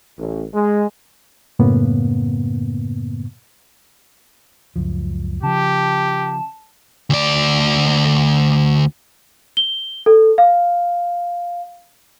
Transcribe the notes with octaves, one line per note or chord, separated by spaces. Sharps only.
A1
G#3
F#2 A2 C#3 A#3 B3
C#2 F#2 F3
C#3 F3 G4 A5
D2 D5
G7
A4
F5